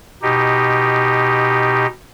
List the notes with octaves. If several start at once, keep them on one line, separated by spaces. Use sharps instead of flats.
B2 D#4 G4